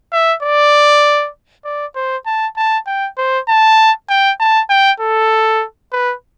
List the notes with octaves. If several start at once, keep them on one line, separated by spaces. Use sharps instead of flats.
E5
D5
D5
C5
A5
A5
G5
C5
A5
G5
A5
G5
A4
B4